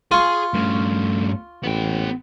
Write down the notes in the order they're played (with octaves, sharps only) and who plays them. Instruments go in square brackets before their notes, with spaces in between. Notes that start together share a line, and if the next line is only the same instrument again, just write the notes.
[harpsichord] F4 C#6 [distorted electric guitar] G#4 G#5
[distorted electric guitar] G2 C#4 [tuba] A3
[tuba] A1 [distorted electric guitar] B3 G5